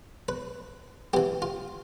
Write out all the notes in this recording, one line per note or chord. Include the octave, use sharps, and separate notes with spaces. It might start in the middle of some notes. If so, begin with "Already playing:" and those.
B4
E3 B3 G4
F4